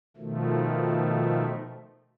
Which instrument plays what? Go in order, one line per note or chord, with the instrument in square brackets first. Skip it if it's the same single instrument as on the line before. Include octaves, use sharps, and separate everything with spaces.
[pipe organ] B2 D#3 F3 A3